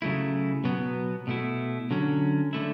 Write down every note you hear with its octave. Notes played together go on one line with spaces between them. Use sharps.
C#3 F#3 A3 E4
B2 F#3 B3
B2 A3 E4
D3 F#3 C#4
D3 A3 E4